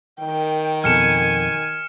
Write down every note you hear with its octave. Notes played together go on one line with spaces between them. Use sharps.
D#3 G5
F2 B2 A4 G#5 F6 C#7 E7